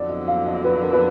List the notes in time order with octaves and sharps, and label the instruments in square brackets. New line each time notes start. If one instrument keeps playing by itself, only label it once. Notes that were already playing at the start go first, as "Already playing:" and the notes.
Already playing: [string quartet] F2 D3 F#3 [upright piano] D5
[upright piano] D#5
F5
D#5
B4
A#4
B4